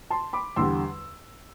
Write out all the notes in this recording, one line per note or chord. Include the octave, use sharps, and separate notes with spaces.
A5 C6
B5 D6
E2 D3 G3 C6 E6